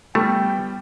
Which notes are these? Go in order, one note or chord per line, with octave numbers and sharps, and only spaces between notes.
G3 A3 B3 G5